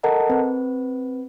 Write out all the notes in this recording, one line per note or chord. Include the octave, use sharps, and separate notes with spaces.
A4 A#4 D#5 F#5 A5 A#5
C4 B4